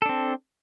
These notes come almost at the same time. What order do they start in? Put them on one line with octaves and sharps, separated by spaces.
A4 D4 C4